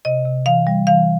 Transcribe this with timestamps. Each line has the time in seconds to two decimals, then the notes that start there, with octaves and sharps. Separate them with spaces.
0.05 C3 D#5
0.26 C3
0.46 E3 F5
0.67 G3
0.87 E3 F5